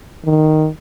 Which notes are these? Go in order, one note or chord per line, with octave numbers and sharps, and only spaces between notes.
D#3